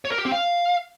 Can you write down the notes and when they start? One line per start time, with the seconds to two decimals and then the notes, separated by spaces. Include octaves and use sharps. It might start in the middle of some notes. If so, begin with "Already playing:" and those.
0.05 C#5
0.12 A#4
0.18 G4
0.25 C4
0.32 F5